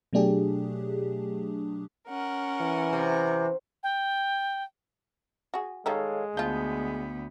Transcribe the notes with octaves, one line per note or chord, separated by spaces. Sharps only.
B2 F#3 A3 D4 G4 G#4
C#4 A#4 F#5
E3
C3
G5
F#4 G#4
D#3 G3 G#3 D#4 A4 C#5 F5
D2 F3 B3 F4 G6